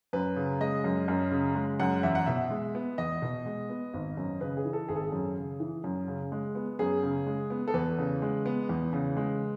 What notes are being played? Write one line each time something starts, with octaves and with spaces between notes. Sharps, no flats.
F#2 B4
C#3
G#3 D#5
F#2
F#2
C#3
G#3
F#2 F#5
E2 E5
F#5
B2 E5
G#3
B3
E2 D#5
B2
G#3
B3
G#1
F#2
C#3 B4
G#4
E3
A4
G#1 G#4
A4
G#4
F#2
C#3
E3
F#2
C#3
G#3
B3
F#2 G#4
C#3
G#3
B3
A4
E2 B4
C#3
G#3
B3
E2
C#3
G#3